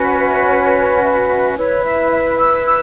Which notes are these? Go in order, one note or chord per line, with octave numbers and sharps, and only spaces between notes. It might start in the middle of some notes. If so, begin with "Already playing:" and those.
Already playing: C#4 F#4 B4
E5
C#5
E5
E4 B4 C#5
E5
E5
E6
E6